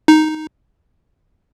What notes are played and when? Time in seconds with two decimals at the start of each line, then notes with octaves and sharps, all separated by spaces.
0.08 D#4